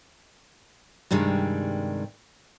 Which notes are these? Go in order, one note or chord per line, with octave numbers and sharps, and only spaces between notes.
G2 C3 D#3 G3 G#3